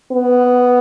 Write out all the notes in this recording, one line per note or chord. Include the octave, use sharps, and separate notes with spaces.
B3